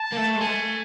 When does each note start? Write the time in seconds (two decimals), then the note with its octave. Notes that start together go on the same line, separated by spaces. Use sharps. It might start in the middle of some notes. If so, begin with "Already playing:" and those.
Already playing: A5
0.12 A#3
0.17 A3
0.35 G#3
0.41 A3 G#5